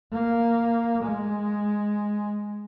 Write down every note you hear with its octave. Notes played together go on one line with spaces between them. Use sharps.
A#3
G#3